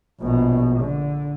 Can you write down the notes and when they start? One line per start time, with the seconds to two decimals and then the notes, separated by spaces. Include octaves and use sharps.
0.21 A#1 B2
0.80 D3